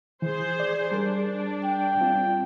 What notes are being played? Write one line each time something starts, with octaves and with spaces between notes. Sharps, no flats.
E3 G#4 C5
D5
G3 D4 G#4 A#4
G5
G3 C4 F4